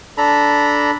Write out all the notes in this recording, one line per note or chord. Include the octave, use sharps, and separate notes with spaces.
D4 A4 A#5 B5